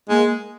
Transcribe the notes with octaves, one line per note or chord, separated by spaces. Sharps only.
G#3 A#3